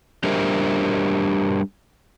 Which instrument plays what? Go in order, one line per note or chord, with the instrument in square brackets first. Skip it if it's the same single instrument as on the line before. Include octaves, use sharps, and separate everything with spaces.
[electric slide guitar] G3 D4 G4 A#4 C5 E5